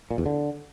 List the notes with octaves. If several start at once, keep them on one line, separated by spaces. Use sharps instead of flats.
A#2
E2
D3